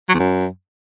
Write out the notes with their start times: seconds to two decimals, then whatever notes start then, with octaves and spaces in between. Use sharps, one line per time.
0.09 F#3
0.14 E2
0.19 F#2